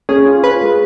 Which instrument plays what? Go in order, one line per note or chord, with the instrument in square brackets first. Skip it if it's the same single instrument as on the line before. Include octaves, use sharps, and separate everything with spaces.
[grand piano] C#4 [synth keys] G#4
[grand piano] F4
[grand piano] F4 [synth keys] B4
[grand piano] G#3